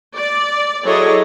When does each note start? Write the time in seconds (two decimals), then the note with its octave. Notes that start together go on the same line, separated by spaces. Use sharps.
0.15 D5
0.83 F#3 E4 G#4 A4 C#5 D#5